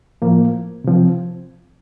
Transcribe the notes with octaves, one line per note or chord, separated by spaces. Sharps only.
A2 F3 A#3
C3 F3 C4